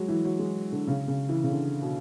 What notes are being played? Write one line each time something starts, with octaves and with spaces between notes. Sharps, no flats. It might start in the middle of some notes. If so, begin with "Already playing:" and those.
Already playing: F#3 G#3
E3
F#3
G#3
D3
C#3
C#3
E3
C#3
D3
B2